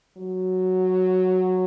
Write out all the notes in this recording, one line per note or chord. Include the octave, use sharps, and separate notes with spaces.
F#3